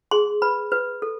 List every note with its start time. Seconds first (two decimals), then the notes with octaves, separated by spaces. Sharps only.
0.11 G#4 C6
0.42 B4 B5
0.72 B4
1.02 A4